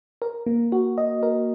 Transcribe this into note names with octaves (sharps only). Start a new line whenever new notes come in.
A#4
A#3
F#4
D#5
A#4